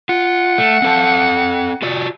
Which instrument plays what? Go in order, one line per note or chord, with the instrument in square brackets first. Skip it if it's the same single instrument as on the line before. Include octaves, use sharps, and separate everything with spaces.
[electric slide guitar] F4 [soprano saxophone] F#5
[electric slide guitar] A3
C4 A4 A5
F4 F#4 D5